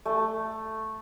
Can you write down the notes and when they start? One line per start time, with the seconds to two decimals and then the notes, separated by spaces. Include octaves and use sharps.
0.05 A3